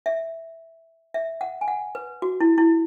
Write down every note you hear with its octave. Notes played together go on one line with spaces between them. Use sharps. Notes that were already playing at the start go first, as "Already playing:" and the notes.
E5
E5
F#5
G#5
F#5
B4
F#4
E4
E4